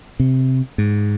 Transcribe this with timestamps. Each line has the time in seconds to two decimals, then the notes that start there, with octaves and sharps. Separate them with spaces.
0.20 C3
0.78 G#2